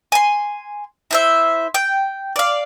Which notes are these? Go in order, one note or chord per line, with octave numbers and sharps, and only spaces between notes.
G#5 C6
E4 C5 E5
G5
D5 F5